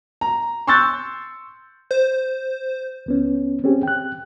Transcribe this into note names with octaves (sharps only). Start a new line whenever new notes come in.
A#5
C6 C#6 E6 F#6 G6 A6
C5
C#2 B3 C#4
C4 C#4 G4 G#4
G5 F#6